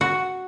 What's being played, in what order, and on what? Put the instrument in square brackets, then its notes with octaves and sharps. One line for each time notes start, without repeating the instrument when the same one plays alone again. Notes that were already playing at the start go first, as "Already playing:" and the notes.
[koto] F#4